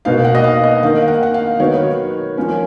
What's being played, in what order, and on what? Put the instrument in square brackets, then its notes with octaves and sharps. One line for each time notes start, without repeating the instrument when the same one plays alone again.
[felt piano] B2 A#3 D#4 F5
F#5
D#5
F5
D#5
D#3 A#3 D#4 F5
F5
F#5
F#5
F5
D#3 F#3 B3 D#4 C#5
F3 A#3 C#4